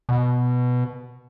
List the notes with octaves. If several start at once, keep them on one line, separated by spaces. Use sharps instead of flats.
B2